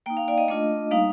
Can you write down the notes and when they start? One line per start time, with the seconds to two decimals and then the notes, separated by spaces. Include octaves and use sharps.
0.06 A#3 D#4 G5
0.17 F5
0.28 D5
0.38 D#5
0.48 A3 D4 F4 D#5
0.91 G3 A#3 D#4 F5